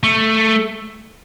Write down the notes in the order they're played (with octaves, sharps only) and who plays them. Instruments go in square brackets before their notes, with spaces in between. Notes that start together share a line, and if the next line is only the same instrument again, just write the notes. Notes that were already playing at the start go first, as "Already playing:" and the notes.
[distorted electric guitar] A3